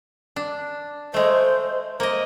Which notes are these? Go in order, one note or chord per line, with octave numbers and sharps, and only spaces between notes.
D4
G#3 A3 C5
A#3 C5 D#5